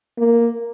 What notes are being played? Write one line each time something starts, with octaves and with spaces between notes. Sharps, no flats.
A#3